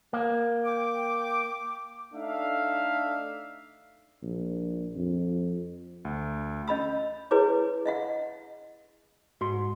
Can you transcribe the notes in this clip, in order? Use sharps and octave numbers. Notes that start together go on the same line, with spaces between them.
A#3
G5 D6
A3 D4 D#4 E5 F5
A#1
F2
D2
C#4 D#5 B5 E6
E4 G#4 B4 C#5 D6
D#5 E5 F#5
G#2 F#4 C6